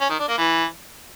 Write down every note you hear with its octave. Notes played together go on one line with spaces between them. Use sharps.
C#4
D#3
D4
A#3
E3